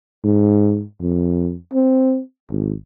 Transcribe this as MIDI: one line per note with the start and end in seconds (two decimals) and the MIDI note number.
0.24 0.83 44
1.01 1.55 41
1.73 2.20 60
2.50 2.73 32